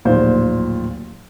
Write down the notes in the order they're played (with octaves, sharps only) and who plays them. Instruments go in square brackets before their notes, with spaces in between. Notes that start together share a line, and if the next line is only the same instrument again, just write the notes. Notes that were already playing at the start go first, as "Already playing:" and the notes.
[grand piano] D1 A#1 D#2 A#2 C5